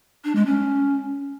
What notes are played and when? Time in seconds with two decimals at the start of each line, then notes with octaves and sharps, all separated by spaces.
0.24 D4
0.35 G#3
0.46 C#4